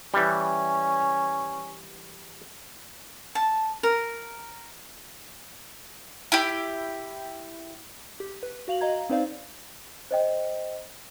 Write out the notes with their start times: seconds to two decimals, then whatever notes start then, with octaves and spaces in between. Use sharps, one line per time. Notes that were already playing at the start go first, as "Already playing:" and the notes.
0.14 E3 G3 C#4
3.35 A5
3.83 A#4
6.32 E4 G4
8.20 G4
8.43 B4
8.68 F#4 F5 F7 F#7
8.81 D#5 F5 A#5 G#6
9.10 C4 D#4 B4 C5 D5 F5
10.11 C5 D#5 G5